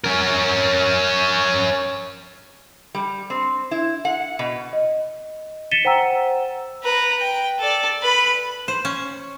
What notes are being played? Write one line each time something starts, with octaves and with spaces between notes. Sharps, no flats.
C#4 A#4
G3
C4
E4
F#5
B2
D#5
A6 B6 C#7 D#7 E7 G7
C5 F#5 G5 A#5 E6
B4 A#5
G5
A4 D5
B4 B5
C5
C#4